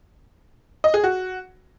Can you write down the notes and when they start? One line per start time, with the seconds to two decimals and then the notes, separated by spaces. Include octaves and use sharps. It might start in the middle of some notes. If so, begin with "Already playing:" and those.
0.84 D#5
0.94 G#4
1.04 F#4